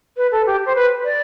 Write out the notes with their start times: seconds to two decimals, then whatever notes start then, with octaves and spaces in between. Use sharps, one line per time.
0.17 B4
0.32 A4
0.46 G4
0.66 C5
0.75 B4
1.05 D5